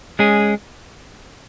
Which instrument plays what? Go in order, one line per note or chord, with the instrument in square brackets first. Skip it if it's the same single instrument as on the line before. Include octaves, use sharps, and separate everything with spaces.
[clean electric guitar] G#3 C#4 G#4